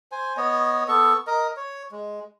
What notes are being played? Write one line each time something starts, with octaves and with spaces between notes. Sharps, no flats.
C5 G#5
B3 C#5 D#5
B3 A4 C#6
A#4 D#5
C#5
G#3